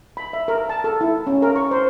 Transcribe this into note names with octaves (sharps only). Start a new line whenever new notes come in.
B5
E5
A#4
A5
A4
E4
C#4
A#4
C#6
C5